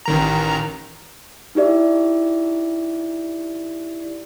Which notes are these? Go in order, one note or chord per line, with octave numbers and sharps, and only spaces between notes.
A1 D#3 A#5
D#4 E4 G4 D5 E5